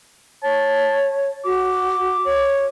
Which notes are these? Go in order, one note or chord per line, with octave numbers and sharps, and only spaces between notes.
C#5 A5
F#4 D6
C#5